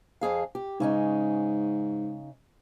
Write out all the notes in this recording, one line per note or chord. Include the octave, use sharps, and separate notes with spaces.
F2 G#4 F5
G4
G#2 C#3 C#4 D#4